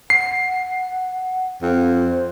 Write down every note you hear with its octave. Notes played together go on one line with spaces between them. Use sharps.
F#5 C7
F2 C5